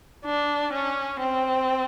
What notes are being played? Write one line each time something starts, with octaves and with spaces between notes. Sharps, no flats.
D4
C#4
C4